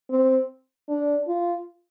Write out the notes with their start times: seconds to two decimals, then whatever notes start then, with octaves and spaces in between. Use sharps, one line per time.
0.10 C4
0.89 D4
1.28 F4